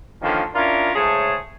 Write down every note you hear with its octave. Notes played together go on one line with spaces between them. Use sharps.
D3 D#3 F3 A#3 C#4
C#4 D4 E4 F4 A#4
G#2 C#3 A3 G#4 C#5 A5